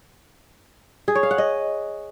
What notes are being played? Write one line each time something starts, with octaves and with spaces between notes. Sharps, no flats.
G#4
C#5
F5
F#5
D#5